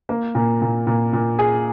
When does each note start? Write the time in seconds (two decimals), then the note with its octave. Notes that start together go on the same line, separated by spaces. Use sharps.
0.09 A#3
0.35 A#2
0.62 A#2
0.87 A#2
1.13 A#2
1.39 G#4